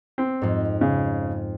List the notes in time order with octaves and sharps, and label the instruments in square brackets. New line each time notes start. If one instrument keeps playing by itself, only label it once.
[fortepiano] C4
[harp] F2 G#2
[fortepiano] C#3